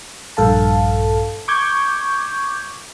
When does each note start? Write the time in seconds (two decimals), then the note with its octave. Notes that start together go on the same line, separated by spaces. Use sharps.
0.37 A#1 G2 A4 F5 A5
1.48 C#6 D6 G6 G#6